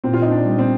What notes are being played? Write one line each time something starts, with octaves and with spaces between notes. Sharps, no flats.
A#2 C4
F4
D#4
D4
G3
C4